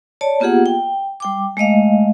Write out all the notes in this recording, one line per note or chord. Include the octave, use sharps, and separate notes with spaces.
C#5 D5 A5
A#3 B3 F4 G4 G#4 F#5
G5
G3 G5 D6
G#3 A3 D#5 F5